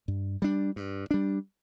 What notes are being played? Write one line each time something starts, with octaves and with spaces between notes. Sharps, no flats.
G2
G3 D4
G2
G3 D4